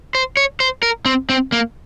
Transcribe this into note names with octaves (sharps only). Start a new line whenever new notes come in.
C5
C#5
C5
A#4
C4
C4
A#3